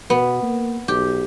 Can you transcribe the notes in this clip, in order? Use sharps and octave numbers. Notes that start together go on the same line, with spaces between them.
B2 B3
A#3
B1 G4